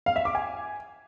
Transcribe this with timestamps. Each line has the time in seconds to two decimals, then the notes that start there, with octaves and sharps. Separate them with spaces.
0.06 F5
0.16 E5
0.25 D6
0.35 G#5